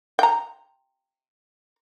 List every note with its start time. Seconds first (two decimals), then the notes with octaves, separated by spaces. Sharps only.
0.19 G5 A#5